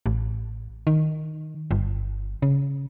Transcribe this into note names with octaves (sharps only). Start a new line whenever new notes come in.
A1
D#3
G1
C#3